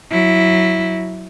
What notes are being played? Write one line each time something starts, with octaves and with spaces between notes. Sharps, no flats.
F#3 E4